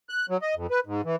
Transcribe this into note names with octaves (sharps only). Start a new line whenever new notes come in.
F#6
F#3
D#5
F2
B4
G#2
E3